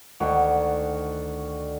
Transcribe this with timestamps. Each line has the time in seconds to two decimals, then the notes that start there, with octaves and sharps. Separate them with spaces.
0.20 D2 D#3 F#4